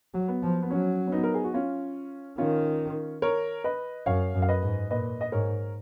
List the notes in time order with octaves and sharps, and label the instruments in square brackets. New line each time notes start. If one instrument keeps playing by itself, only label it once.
[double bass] F#3
[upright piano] B3
[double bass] F3
[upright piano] B3
[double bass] F#3 [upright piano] C#4
[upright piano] C#4
B3 D#4
A#4
G#4
F#4
C#4 F4
[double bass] D#3 [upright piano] C#4 F4
[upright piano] A#4 C#5
B4 D#5
[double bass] F#2 [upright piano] C#5 F5
[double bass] F#2
[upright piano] F5
B4 D#5
[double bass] G#2
[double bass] A#2 [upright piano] B4 D#5
[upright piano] D#5
[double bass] G#2 [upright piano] A#4 C#5